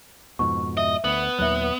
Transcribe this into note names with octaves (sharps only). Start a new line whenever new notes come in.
F2 G#2 B2 C#6
D#5 E5
D2 B3
D#2 A#2 F#3 E5 F#6